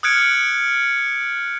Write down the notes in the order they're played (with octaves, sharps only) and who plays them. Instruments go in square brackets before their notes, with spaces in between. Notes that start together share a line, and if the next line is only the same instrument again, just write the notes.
[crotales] D#6 F6 F#6 G#6 C#7 D7